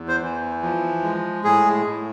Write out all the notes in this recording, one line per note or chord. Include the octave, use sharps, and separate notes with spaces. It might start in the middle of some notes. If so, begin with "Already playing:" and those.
Already playing: E2
C5
E3
F3
G#3
A2 G#4
A2